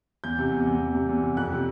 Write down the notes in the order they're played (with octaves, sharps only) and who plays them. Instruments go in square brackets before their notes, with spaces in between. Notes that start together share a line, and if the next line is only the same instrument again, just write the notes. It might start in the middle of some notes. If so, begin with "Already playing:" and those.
[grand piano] E2 G6
C3
E2
E2
E2
C3
E2
C3
F2 F#6
C3